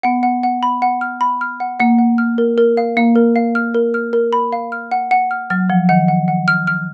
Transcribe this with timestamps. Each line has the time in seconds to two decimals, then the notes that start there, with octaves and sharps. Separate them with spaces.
0.03 B3 F#5
0.23 F#5
0.43 F#5
0.63 B5
0.82 F#5
1.01 F6
1.21 B5
1.41 F6
1.60 F#5
1.80 A#3 F#5
1.98 F#5
2.18 F6
2.38 A#4
2.58 A#4
2.77 F5
2.97 A#3 F5
3.16 A#4
3.36 F5
3.55 F6
3.74 A#4
3.94 F6
4.13 A#4
4.33 B5
4.53 F5
4.72 F6
4.92 F#5
5.11 F#5
5.31 F6
5.50 F#3 F6
5.70 F3 F#5
5.89 D#3 F#5
6.08 F#5
6.28 F#5
6.48 F6
6.67 F6